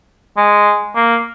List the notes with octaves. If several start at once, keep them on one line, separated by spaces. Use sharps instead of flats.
G#3
A#3